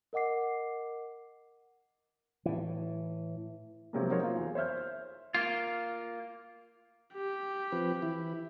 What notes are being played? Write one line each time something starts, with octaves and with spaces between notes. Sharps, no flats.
A#4 D#5 F#5 D6 C7
A2 E3
C3 F3 F#3 G#3 A#3
D#4 F#4 A#4 C5 C#5
A#3 F4
E2
C5 C#5 E5 F6 G6
A#3 F4
G4
F3 C4 B4
E3 E4